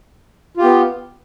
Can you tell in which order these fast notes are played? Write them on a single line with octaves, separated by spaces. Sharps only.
F4 G4 B3